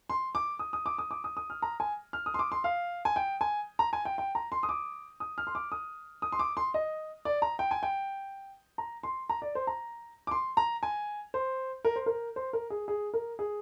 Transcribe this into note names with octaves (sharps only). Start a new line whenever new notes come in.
C6
D6
D#6
D#6
D6
D#6
D6
D#6
D#6
F6
A#5
G#5
F6
D#6
C6
D6
C6
F5
G#5
G5
G#5
A#5
G#5
G5
G5
A#5
C6
D#6
D6
D#6
F6
C6
D6
D#6
D#6
C6
D6
C6
D#5
D5
A#5
G5
G#5
G5
A#5
C6
A#5
D5
C5
A#5
D6
C6
A#5
G#5
C5
A#4
C5
A#4
C5
A#4
G#4
G#4
A#4
G#4